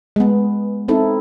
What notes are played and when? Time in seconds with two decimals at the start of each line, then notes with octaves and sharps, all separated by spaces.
0.16 G#3 B3
0.88 C4 D#4 E4 A4